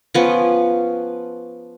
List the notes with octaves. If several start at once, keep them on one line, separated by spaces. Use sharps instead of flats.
F3 B3 C#4